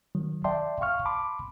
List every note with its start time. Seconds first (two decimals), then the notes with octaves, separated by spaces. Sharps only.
0.15 D#3 F#3
0.44 D5 E5 G5 A5 C6
0.81 F5 C#6 F6
1.06 A5 B5 C6 D6